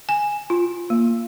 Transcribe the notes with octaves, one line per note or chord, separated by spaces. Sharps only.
G#5
F4
A#3